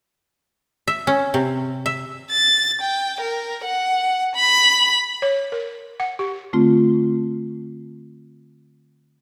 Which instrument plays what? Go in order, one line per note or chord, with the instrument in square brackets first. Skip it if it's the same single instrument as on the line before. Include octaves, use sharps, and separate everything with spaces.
[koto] E5
C#4
C3
E5
[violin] A6
G5
A#4
F#5
B5
[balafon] C#5
A#4
F#5
G4
[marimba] D3 A3 C4 F4